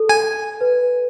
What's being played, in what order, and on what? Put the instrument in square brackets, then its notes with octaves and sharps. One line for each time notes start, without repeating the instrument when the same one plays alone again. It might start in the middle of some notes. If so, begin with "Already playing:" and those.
Already playing: [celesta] A4
[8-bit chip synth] G#5
[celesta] B4